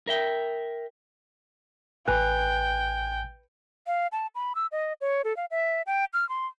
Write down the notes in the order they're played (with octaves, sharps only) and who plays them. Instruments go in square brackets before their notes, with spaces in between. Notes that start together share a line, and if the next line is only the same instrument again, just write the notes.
[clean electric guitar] A#4 E5 G5
[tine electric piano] A1 G#5 F#6 [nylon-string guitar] B4 [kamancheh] G5
[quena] F5
A5
B5
E6
D#5
C#5
A4
F5
E5
G5
F6
C6